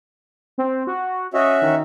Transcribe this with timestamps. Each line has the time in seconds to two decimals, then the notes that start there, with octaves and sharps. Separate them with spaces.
0.58 C4
0.87 F#4
1.34 C#4 F#4 D#5 E5
1.62 D#3